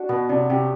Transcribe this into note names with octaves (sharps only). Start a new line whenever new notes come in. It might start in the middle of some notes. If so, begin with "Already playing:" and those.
Already playing: D4 F#4
B2 B3
C3 D4
C3 G4